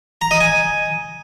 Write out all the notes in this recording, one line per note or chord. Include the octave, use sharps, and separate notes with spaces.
A#5
D#5
G#5